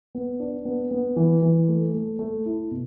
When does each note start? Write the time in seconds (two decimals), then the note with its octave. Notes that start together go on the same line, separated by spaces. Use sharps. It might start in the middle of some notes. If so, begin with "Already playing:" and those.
0.15 B3
0.40 D4
0.65 B3
0.91 B3
1.16 E3
1.42 E3
1.68 A3
1.94 A3
2.19 A3
2.46 E4
2.71 B2